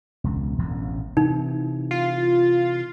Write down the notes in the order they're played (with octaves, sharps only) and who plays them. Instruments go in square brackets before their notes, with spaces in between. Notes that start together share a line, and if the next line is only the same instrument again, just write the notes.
[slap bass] E1 C#2
E1 A1 A2
[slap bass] C3 E3 [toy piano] D#4
[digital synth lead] F4